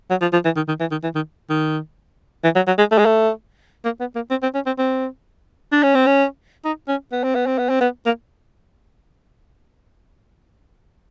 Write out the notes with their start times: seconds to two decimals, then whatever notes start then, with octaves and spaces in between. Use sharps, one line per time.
0.10 F#3
0.22 F3
0.33 F3
0.45 E3
0.56 D#3
0.68 D#3
0.80 E3
0.91 D#3
1.03 E3
1.15 D#3
1.50 D#3
2.44 E3
2.55 F#3
2.67 F#3
2.78 G#3
2.91 A3
2.98 G#3
3.05 A3
3.85 A#3
4.00 B3
4.15 A#3
4.30 C4
4.43 C4
4.54 C#4
4.66 C4
4.78 C4
5.72 D4
5.83 C#4
5.95 C4
6.06 C#4
6.65 D#4
6.88 C#4
7.12 B3
7.24 C4
7.35 B3
7.46 C4
7.58 B3
7.69 C4
7.80 B3
8.06 A#3